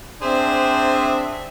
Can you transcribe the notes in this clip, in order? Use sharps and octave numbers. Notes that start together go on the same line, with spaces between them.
C4 D4 G#4 C5 E5